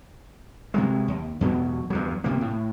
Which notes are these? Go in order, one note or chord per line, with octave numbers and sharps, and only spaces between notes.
C3 F#3 G#3
D#2
E2 B2 F#3
E2 G2 F#3
C3 A#3
A2